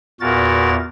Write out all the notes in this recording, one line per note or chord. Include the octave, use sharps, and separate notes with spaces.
E2 A#2 F#4 A#4 A6